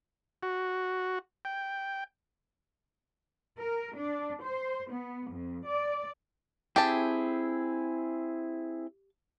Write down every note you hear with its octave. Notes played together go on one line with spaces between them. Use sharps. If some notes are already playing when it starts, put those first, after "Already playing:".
F#4
G5
A#4
D4
C5
B3
F2
D5
C4 E4 G4 G#4 A5